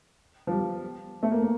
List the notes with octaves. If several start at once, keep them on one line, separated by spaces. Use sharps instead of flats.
F3
G3
A3
A#3
A#3